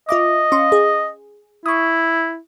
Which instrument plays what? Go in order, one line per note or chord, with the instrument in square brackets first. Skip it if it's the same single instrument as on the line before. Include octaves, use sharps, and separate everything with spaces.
[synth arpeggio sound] F4 E5 D6 [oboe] D#5
[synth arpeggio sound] C#4 F5 C6
G#4
[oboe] E4 [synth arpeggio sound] C#6 D#6